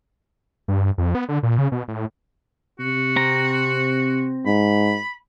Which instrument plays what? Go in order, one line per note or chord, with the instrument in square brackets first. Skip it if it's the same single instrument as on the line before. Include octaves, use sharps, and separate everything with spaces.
[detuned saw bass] G2
F2
B3
D3
A#2
C#3
B2
A2
[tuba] C3 [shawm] F#4
[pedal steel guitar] C4 A#5
[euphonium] G#2 [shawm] B5